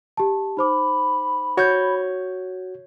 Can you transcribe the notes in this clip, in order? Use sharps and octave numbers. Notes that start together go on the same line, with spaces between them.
G4 A5
D#4 C5 B5 D6
F#4 C#5 G6